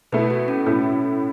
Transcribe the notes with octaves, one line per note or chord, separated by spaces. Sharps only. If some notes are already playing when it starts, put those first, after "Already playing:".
B2 A3 E4 B4
F#4
C#4
A2 A3 C#4 E4